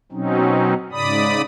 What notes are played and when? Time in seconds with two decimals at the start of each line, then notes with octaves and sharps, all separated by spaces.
0.12 B2 F#3 C4 C#4 D#4
0.92 G#2 C#3 D5 B5 D#6